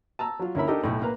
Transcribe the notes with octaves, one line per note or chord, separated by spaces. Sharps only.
A5 A#5 E6
F#3 F4
D2 C#4 E4 A#4 E5 B5
D4 D#4 G4 A4 A#4 D#5
B1 A2
A#3 B4 A#5